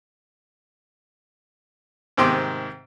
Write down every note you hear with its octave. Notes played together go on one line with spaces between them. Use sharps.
G#2 C3 D#3 G5 C6 D6